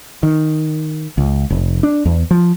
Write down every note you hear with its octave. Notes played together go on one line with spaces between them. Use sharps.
D#3
C#2
F1
D4
E2
F3